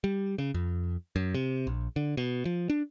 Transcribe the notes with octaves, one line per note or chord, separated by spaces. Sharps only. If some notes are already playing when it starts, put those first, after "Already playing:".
G3
C#3
F2
F#2
C3
A#1
D3
B2
F3
D4